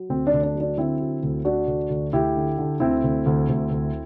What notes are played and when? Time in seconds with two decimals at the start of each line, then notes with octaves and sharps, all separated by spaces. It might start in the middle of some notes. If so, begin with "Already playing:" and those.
Already playing: F#3
0.09 D2 C4
0.27 D4
0.33 D2
0.43 D4
0.55 F#3
0.61 D4
0.77 D3 C4 E4
1.00 F#3
1.23 D2
1.45 D3 D4 F#4
1.67 D2
1.90 D2
2.13 D2 E4 G4
2.36 D3
2.58 D3
2.80 D2 C4 E4
3.04 D2
3.26 D2
3.49 D2
3.71 D2